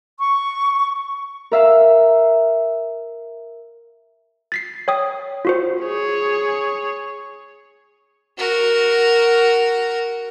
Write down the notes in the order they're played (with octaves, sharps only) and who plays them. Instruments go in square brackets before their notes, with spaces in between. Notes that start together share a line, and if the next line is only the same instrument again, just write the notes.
[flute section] C#6
[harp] A#4 E5 F5
[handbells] A6 B6 C7
C#5 G5 D#6
F4 F#4 C5
[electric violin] G#4 C#5
[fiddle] F#4 A#4